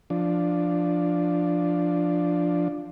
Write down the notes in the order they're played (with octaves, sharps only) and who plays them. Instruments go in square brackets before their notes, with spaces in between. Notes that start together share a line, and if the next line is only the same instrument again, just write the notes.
[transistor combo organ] F3 D4